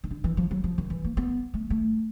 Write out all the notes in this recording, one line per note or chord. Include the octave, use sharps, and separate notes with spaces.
D#3
D3
E3
F3
F#3
F3
D#3
E3
A#3
B3
A3
A3